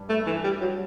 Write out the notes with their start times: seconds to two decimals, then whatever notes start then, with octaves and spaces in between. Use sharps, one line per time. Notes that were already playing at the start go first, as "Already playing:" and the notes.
Already playing: G2
0.09 A3
0.26 E3
0.44 G3
0.61 F#3